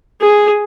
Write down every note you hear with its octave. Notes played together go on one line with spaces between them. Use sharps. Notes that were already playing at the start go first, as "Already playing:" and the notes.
G#4